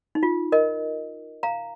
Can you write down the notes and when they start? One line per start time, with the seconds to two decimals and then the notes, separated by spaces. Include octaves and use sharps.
0.15 D#4
0.23 F4
0.52 A#4 D#5
1.43 F5 A#5